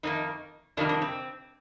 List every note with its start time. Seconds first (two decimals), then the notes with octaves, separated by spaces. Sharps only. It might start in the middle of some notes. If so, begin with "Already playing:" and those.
0.03 F2 D#3 A#3 D#4
0.77 F2 C3 D#3 G3 A#3 D4
0.89 D4
1.02 C4